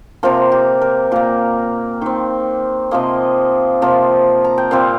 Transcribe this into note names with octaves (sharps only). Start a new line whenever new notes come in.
C3 F3 A#3 A#4
G4
A#4
A#2 A#3 A#4
D#3 C4
C3 F3 A#3 D#5
C3 F3 A#3
A#5
G5
A#2 G3 C4 F5